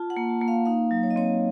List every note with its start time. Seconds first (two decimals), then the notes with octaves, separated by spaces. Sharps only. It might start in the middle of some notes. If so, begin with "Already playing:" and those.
Already playing: F4 A5
0.10 F#5
0.17 A#3
0.29 A5
0.41 A#3
0.48 F5
0.65 D#4 F5
0.91 F#3
1.03 C#5
1.10 D#5
1.16 C4 C#5